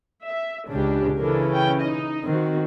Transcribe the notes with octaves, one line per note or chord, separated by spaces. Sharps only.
E5
C#2 C#3 D4 G4
C#3 E3 D4 A4 A#4
C#4 G5
D#4 D#5
D#3 C4 F#4